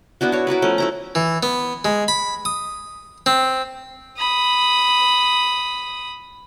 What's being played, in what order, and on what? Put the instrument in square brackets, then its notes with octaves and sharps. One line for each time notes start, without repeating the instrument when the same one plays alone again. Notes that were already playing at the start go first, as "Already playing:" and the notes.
[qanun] B3 D4 E4 F#4
F#4 C#5
E4 F#4 A#4 B4
F3 A3 C#4
A3 E4 A#5
[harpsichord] E3
B3
G#3
B5
D#6
C4
[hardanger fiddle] B5 D#6